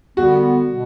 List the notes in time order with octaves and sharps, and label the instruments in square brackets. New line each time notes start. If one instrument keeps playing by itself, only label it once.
[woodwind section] D3 G3 B3 [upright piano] F#4
[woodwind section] B2